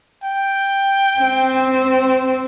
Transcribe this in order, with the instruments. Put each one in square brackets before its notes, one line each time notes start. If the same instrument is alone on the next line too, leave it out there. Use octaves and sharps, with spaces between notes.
[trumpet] G5
[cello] C4